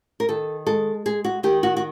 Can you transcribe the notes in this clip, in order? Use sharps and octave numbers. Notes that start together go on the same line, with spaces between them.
A#4
D#3 A4
G#3 A4
G#3 G#4
F#4
D#3 G4
F#4
F#4